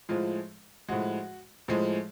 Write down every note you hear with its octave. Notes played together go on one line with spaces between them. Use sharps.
A2 F3 G#3 F4
A2 F3 G#3 F#4
A2 F3 G#3